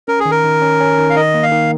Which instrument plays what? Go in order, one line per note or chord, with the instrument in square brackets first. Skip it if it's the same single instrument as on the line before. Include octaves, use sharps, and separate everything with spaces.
[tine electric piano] C#4 [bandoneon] A#4
[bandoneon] G#4
[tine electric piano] D#3
[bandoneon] A#4
[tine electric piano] D#3
C#4
C#4
D#3
[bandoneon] F5
[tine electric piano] D#3 [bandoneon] D#5
[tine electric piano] A#3
[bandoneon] F5
[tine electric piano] D#3